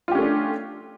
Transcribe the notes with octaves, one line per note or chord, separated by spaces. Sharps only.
A3 C#4 D4 F4 G4